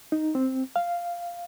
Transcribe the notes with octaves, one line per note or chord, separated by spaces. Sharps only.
D#4
C4
F5